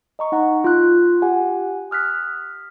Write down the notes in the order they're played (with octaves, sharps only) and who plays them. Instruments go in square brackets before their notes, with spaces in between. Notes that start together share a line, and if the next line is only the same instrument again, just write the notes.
[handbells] D#5 A#5 C#6
D#4 F#5 A#5
F4 F#6
G4 F#5 G#5
D#6 F6 F#6 B6